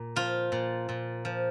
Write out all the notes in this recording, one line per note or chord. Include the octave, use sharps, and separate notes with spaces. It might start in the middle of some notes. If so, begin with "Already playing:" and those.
Already playing: A#2
F3 F4
A#2
A#2
F3